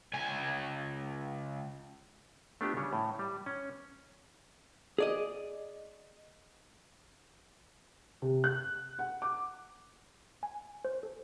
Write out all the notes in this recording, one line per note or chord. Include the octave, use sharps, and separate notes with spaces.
C#2 G#5
A3 B3 D4 F4 G4
C#3 G3 C#5
A2
G3
C#4
G#4 D5 D#5
C3
F#6
F#5
D6
G#5
C5
A4